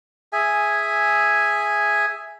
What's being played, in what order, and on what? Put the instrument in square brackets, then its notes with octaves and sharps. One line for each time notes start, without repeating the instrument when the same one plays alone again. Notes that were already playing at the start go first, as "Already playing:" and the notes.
[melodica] G#4 E5 G#5